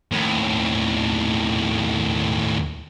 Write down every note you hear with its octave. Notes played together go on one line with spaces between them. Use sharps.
D#2 A2